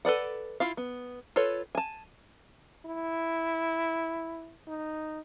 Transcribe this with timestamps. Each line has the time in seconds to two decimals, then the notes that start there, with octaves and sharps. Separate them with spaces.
0.05 A4 B4 D5 F#5
0.60 E4 F4 F5
0.77 B3
1.36 F4 A4 B4 C#5
1.75 G#5 A5
2.86 E4
4.68 D#4